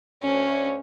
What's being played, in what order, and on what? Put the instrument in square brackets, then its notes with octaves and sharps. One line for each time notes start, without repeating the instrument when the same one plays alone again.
[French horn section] D2 C#5 [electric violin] C#4